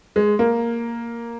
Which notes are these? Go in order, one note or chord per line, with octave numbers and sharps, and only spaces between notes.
G#3
A#3